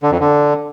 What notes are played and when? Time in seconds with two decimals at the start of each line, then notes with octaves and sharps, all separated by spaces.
0.03 D3
0.11 F2
0.20 D3